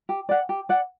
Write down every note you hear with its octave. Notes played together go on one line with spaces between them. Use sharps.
G4
D5 F#5
G4
D5 F#5